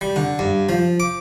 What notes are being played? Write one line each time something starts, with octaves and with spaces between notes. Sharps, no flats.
G3
D3
G2
F3
D6